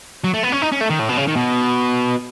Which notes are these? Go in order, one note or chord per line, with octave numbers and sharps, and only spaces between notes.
F#3
A3
B3
C#4
D#4
C#4
A3
D#3
A2
B2
C#3
D#3
B2